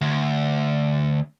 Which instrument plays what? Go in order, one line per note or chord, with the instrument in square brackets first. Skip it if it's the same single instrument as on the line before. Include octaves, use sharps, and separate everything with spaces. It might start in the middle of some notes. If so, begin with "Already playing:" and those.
[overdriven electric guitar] D2